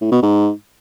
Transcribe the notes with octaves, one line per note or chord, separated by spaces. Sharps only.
A2
B2
G#2